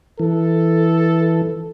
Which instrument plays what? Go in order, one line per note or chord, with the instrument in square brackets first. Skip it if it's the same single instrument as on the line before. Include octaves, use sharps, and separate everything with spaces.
[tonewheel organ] E3 [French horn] A4